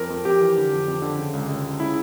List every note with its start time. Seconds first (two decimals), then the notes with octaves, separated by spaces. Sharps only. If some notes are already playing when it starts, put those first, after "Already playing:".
Already playing: F2 A#4
0.10 F2
0.25 F2 G4
0.41 E3
0.56 D3
0.72 F2
0.88 F2
1.02 D3
1.19 C#3
1.33 C#2
1.49 C#2
1.64 C#2
1.80 C#3 E4